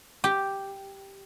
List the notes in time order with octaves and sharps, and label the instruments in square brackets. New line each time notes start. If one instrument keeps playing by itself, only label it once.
[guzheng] G4